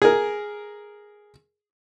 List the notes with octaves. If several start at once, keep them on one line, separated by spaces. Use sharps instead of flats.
G#4 A#4